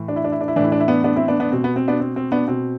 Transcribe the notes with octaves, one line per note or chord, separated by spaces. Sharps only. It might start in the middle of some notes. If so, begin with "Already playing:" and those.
Already playing: A2 E3
D4
E4
D4
E4
D4
E4
A2 E3 D4
E4
D4
E4
B3 D4
B3 D4
C4 E4
B3 D4
B3 D4
B2 C4
B3
C4
B3 D4
C4
C4
B3 D4
B2 C4